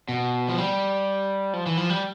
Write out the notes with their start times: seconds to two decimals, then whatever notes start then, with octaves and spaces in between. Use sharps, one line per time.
0.09 B2
0.49 F3
0.58 G3
1.53 F3
1.66 E3
1.77 F3
1.90 G3